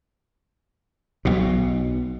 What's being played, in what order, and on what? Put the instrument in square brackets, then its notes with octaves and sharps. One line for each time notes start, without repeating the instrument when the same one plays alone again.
[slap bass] B1 B2